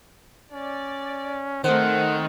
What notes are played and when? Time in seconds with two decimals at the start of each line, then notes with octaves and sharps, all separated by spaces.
0.52 C#4 D5
1.64 D#3 A3 C4 D#4 C5 F#5